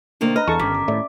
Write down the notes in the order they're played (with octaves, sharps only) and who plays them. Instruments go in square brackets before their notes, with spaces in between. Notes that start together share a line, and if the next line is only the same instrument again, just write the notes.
[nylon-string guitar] C3 D#3 A#3 [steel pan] D4
[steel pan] B4 A#5 [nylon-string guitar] D#5 [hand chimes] F6
[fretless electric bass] E2 [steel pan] A4 A5 C#6 [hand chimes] A#5
[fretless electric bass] G1 [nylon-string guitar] D#3 [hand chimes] C#4 D6 B6
[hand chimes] D6
[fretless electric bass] A2 [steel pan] D5 E5